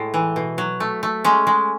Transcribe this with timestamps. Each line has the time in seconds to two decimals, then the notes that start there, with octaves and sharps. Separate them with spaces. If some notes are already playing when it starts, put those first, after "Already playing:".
Already playing: A2 G#3
0.14 E3
0.36 B2
0.58 F#3
0.80 A3
1.03 A3
1.24 G#3 C#4
1.47 G#3